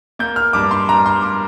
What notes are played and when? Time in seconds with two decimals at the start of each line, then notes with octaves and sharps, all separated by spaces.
0.19 A#3 G6
0.36 F6
0.53 G2 D6
0.71 C6
0.89 G2 A#5
1.06 C6
1.22 A#3 D6